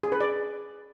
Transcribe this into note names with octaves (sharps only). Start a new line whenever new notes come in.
G#4
B4
D5